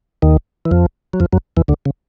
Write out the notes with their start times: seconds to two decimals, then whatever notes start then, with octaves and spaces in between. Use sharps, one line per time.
0.22 D#2 D#3
0.65 E3
0.71 F2 F3
1.13 F#3
1.20 F2 F3
1.33 F#2 F#3
1.57 E2 E3
1.68 D2 D3
1.85 C#3